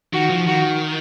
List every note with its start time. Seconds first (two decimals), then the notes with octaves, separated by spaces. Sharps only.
0.13 D#3 F#4
0.30 F3
0.47 D#3 F#4